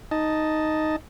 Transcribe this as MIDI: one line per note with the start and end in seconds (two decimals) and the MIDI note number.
0.11 0.96 63
0.11 0.96 75
0.11 0.96 81